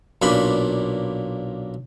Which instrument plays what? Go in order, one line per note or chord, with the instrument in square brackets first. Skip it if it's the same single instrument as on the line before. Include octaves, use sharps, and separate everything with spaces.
[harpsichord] B1 A#2 A#3 D4 B5